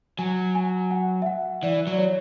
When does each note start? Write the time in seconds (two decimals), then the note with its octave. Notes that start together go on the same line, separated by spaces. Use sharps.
0.19 F#3 G#5
0.55 G#5
0.91 F#5
1.22 E5
1.26 F#5
1.63 E3 D5
1.87 F#3
1.92 D5
1.98 C#5